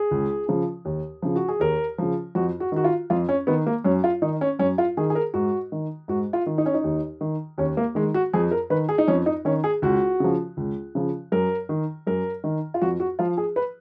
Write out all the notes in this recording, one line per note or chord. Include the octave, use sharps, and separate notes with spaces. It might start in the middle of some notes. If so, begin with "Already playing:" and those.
Already playing: G#4
C#2
C#3 F3
D#2
C#3 F3
F#4
G#4
D#2 A#4
C#3 F3
F2 F#4
F#4
D#3 F#4
F4
F2 F4
C#4
D#3 B3
A#3
F#2 C#4
F4
D#3 D#4
C#4
F#2 C#4
F4
D#3 G#4
G#4
A#4
G#2 F#4
D#3
G#2 F#4
F4
D#3
D#4
C#4
D#4
D#2
D#3
D#2 C#4
A#3
D#3 G#3
F#4
F2 G#4
A#4
D#3 B4
G#4
D#4
F2 C#4
D#4
D#3 C#4
G#4
C#2 F#4
C#3 F3
C#2
C#3 F3
F#2 A#4
D#3
F#2 A#4
D#3
F4
F2 F#4
F#4
F3 F4
G#4
B4